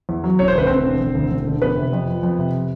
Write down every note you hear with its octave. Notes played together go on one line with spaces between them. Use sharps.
E2
F#3
E1 C#5
C5
D2 B4
E1 C4 C5
D3
E1
D2
E1
D3
F2 B3 B4
C3
F2
F3
F2
C3